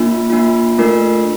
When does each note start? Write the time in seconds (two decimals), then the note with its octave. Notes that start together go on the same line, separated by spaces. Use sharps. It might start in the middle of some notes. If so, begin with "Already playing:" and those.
Already playing: A#3 D4 F4
0.30 A#3 D4 F4
0.78 A3 D4 F4 A#4